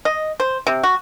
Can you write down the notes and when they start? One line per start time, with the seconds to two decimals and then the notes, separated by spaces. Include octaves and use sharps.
0.05 D#5
0.40 C5
0.67 C3
0.83 F#4